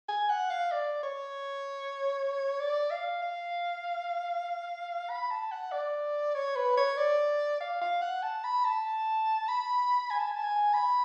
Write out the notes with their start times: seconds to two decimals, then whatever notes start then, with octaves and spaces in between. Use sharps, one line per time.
0.09 G#5
0.30 F#5
0.50 F5
0.72 D5
1.03 C#5
2.60 D5
2.91 F5
3.22 F5
5.10 B5
5.31 A5
5.52 F#5
5.72 D5
6.35 C#5
6.56 B4
6.77 C#5
6.97 D5
7.61 F5
7.81 F5
8.02 F#5
8.23 A5
8.44 B5
8.65 A5
9.49 B5
10.11 G#5
10.19 A5
10.27 G#5
10.36 A5
10.44 G#5
10.74 B5